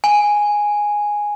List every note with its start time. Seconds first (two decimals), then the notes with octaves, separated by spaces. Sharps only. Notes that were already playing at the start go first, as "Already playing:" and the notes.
0.04 G#5